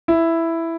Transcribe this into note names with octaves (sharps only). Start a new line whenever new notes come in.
E4